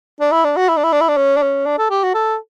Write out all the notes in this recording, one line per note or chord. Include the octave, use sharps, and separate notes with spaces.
D4
E4
D4
F#4
E4
D4
E4
D4
E4
D4
C#4
D4
C#4
D4
A4
G4
F#4
A4